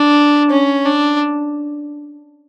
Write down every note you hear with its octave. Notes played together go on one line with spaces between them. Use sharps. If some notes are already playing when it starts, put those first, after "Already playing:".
Already playing: D4
C#4
D4